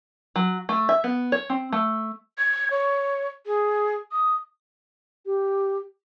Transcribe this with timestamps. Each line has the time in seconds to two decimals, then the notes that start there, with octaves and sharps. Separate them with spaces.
0.36 F#3
0.69 A3
0.89 E5
1.04 B3
1.32 C#5
1.50 C4
1.72 A3
2.38 G#6
2.71 C#5
3.46 G#4
4.12 D#6
5.26 G4